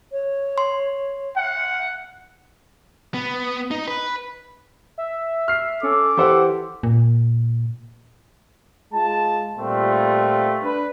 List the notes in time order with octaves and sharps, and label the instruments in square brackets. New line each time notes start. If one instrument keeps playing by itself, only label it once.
[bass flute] C#5
[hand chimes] C6
[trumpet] F#5
[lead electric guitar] B3
D#4
B4
[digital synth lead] E5
[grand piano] F6 C7
[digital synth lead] C#4 [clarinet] A4 [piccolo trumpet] D6
[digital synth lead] E3 [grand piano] G4 C5 F#5 [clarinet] A4
[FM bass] A#2
[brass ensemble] G#3 F4 A5
A#2 G3 A3 C4 F4
D4 B4